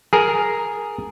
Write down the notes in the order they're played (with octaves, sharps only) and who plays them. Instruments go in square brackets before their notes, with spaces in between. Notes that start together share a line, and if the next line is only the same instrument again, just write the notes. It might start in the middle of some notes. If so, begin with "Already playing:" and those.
[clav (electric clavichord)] G#4 A#4